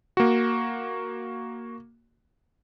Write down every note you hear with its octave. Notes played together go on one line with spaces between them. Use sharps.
A#3 F#4